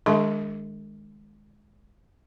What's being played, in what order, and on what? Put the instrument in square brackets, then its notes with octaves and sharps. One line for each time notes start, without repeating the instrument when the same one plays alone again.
[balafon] D#3 G#3 D4 G#4 E5 C6